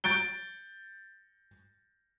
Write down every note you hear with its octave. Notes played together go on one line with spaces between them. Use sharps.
G6 A6 D7 G7